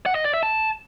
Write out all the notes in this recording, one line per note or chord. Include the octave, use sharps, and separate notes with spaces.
F#5
D#5
D5
E5
A5